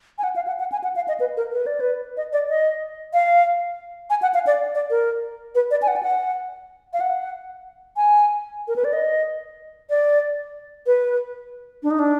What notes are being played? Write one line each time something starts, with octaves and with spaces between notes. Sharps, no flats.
G#5
F#5
F5
F#5
F#5
G#5
F#5
F5
D#5
B4
A#4
B4
D5
B4
D#5
D5
D#5
F5
G#5
F#5
F5
D5
D5
A#4
B4
D5
G#5
F#5
G#5
F#5
F5
F#5
G#5
A#4
B4
D5
D#5
D5
B4
D4
D#4
D4